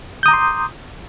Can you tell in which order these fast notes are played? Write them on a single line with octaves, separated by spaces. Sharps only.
G6 D#6 A#5 D6 C6